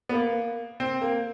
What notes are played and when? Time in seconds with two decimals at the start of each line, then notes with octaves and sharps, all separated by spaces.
0.09 B3
0.13 A#3
0.80 C4
1.02 A#3